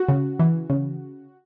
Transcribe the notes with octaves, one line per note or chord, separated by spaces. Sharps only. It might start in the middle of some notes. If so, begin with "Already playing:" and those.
Already playing: F#4
C#3
E3
C#3